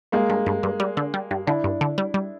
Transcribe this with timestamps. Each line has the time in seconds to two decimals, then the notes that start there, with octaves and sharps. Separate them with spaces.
0.12 G2 G#3 A#3
0.30 G2
0.46 G2
0.63 G2
0.80 G3
0.97 D3
1.14 G3
1.31 G2
1.47 D3 D4 E4
1.64 G2
1.81 D3
1.98 G3
2.14 G3